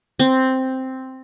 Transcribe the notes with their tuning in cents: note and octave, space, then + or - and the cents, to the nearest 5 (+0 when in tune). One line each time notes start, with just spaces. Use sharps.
C4 +0